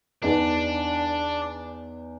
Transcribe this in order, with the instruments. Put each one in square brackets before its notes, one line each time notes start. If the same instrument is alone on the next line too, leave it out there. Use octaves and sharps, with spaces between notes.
[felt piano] E2 D#4 B4 [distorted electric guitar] D4